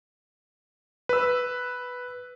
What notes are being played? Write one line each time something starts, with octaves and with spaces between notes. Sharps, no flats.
B4 E6